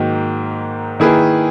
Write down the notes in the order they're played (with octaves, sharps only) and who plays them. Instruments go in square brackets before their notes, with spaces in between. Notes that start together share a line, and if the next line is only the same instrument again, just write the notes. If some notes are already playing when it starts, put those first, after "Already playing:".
Already playing: [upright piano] G#2 D#3 F#3 A#3
D#3 A#3 E4 G#4 B4